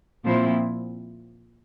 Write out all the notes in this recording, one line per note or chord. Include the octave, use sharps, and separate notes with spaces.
A#2 F3 C4 E4 C5